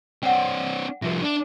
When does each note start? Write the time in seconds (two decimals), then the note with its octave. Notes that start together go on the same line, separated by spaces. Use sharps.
0.23 C4 D4 F#5 G5
1.02 C2 F3 B4 E5
1.22 D4